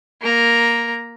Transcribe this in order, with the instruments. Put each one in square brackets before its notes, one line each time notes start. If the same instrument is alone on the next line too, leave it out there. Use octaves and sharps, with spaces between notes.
[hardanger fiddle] A#3 A#5